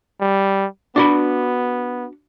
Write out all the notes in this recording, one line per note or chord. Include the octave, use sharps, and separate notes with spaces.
G3
B3 D4 F#4 B5